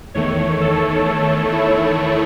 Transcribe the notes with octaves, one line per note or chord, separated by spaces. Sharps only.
E2 D#3 A3 C#5
A4
A4
E4